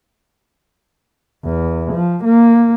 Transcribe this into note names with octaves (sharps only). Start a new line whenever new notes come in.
E2
F3
A#3